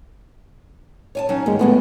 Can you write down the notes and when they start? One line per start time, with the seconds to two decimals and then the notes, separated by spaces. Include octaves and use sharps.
1.15 C#5 G#5 A5
1.29 F#3 C#4 D#4
1.46 D#2 G#2 G#3 A#3
1.59 A2 D3 G#3 A3 B3